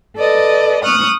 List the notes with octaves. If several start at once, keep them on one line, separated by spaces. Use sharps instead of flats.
A4 B4 D5 D#5
C#6 D#6 F6 F#6